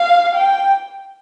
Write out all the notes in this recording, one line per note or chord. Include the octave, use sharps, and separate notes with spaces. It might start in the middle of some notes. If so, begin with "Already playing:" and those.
Already playing: F5
G5